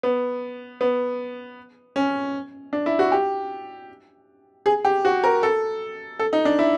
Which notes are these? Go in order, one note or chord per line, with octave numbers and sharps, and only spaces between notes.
B3
B3
C#4
D4
E4
F#4
G4
G#4
G4
F#4
A#4
A4
A4
D#4
D4
E4